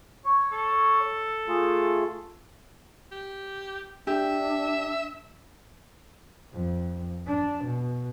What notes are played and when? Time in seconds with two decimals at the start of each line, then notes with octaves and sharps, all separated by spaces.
0.25 C#5
0.52 A4
1.48 A3 F4 G#4
3.11 G4
4.07 D4 G4 E5
6.53 F2
7.27 D4
7.65 B2